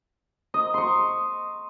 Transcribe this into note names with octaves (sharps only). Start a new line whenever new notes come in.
D#5
C6 C#6